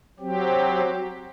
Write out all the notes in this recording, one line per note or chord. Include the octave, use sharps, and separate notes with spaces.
F#3 C4 G4